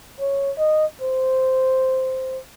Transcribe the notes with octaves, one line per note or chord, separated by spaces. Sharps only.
C#5
D#5
C5